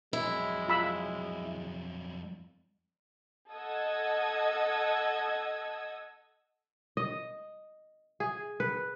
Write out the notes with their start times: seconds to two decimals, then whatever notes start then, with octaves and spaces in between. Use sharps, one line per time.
0.13 F2 F#3 G#3 E4
0.68 F4 B5 E6
3.51 A4 D#5 F#5 D#6 E6 G#6
6.97 D#5
8.20 G#4
8.60 B4